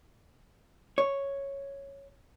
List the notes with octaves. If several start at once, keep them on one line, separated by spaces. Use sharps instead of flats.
C#5